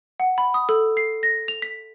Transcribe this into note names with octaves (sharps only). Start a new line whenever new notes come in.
F#5
B5
D#6
A4
C7
A#6
F7
B6